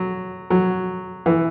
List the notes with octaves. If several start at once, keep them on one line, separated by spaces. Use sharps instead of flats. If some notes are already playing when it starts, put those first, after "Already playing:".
Already playing: F#3
F#3
E3